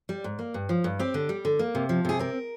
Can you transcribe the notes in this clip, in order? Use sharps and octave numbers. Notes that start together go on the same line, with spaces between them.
G3
G#2
A#3
G2
F3
G2
C4 G4
D3
G3
D3
A#3
C3
F3
C3 G#4
C4 A#4